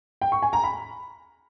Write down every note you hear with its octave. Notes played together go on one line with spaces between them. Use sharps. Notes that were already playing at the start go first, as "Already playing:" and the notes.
G5
C#6
G#5
A#5
B5